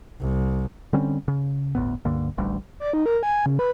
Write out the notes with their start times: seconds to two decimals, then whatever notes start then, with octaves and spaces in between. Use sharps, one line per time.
0.21 C2
0.93 D3 G3 C4 C#4
1.28 C#3
1.75 G1 D2 A2 B3
2.05 C#2 G2 D3 A#3
2.37 D1 A1 D2 G3
2.80 D5
2.93 D#4
3.06 A#4
3.23 G#5
3.46 C#3
3.59 B4